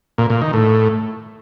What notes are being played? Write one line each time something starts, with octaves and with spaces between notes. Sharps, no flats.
A#2
A#2
D#3
A2